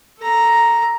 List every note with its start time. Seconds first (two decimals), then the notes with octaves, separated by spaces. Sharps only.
0.20 A4 A#5